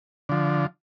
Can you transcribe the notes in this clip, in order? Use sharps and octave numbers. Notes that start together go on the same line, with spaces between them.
D3 F3